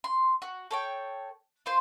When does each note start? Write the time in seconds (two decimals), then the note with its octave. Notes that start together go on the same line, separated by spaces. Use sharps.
0.04 C6
0.42 F#4
0.71 A4 C#5 G5
1.66 F4 C5 C6